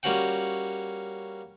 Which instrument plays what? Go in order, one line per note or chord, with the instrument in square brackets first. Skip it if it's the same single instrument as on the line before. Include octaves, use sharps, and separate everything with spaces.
[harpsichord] G3 A#3 C#4 F#4 F#5 G5